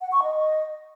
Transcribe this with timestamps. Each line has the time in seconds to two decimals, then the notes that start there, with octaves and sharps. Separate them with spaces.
0.01 F#5
0.12 C#6
0.23 D#5